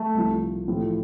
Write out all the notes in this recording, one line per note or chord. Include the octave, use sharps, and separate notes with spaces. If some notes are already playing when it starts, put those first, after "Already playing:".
Already playing: A3
C2 C3 F3
A1 A2 F3